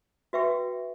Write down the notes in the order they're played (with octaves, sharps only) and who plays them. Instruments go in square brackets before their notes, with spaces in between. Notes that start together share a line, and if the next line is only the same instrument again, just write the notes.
[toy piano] F#4 B4 E5 G5 C#6